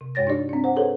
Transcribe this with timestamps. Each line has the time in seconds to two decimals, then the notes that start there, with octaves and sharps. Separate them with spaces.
0.01 C3
0.15 G2 G#3 C#5 A6 A#6
0.27 D4 D#4 G4 D5
0.49 C4 D4
0.64 C5 F#5
0.76 G#4 A4 B4 C#5 F#5